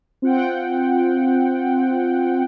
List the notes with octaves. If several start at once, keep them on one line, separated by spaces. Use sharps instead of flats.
C4 F4 F#5 G5